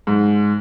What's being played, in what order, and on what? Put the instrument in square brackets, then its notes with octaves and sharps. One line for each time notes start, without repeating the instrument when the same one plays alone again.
[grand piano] G#2